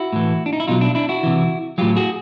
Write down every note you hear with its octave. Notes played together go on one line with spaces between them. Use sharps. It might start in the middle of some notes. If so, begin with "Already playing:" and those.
Already playing: E4 F#4
A2 E3
D4
D#4
E4
B2 F#3 D#4 F4
D4 E4
D4 E4
E4 F#4
C3 E3
A2 F#3 F4 G4
F#4 G#4